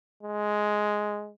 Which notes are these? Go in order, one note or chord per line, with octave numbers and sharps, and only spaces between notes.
G#3